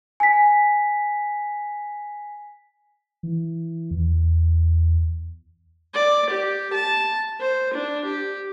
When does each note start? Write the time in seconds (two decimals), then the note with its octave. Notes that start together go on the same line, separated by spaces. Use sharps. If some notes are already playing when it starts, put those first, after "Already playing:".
0.20 G#5 B6
3.23 E3
3.91 E2
5.94 D5
6.31 G4
6.73 A5
7.41 C5
7.74 D4
8.05 G4